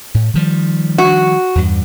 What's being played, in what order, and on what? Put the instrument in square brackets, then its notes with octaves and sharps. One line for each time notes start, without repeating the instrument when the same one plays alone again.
[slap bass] A2
D#3 F3 G3
[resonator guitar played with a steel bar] F#4
[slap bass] E2 G2